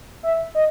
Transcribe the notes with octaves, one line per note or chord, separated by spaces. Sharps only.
E5
D#5